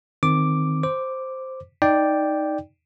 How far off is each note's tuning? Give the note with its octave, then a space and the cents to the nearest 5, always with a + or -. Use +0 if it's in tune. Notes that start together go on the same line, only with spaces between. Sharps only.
D#3 +0 C4 +0 D6 +0
C5 +0 D6 +0
D#4 +0 D5 +0 G5 +0